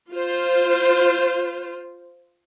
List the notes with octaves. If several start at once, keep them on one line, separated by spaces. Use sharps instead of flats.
F4 C5